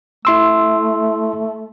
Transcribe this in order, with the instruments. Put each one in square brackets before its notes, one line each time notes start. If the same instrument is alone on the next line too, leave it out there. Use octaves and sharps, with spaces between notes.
[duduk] A3 [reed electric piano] E4 C6 E6